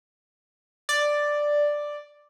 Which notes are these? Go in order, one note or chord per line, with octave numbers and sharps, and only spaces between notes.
D5